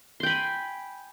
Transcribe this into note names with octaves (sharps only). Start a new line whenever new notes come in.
G5 G#5 B5 C6